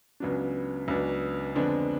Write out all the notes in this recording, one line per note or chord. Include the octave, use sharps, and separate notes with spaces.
C#2 C#3 F#3 B3 D4
C#2 C#3 F#3 B3 D4
F2 D3 G#3 B3 D4